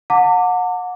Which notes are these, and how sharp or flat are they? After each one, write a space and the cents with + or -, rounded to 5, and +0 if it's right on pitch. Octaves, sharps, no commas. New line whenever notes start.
F#5 -30 A5 +45 D6 -10